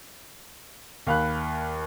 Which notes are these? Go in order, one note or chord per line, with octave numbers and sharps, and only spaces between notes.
D#2 F5 B5 F#6